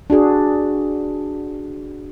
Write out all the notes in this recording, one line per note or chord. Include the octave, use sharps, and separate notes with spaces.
D4 F#4 G#4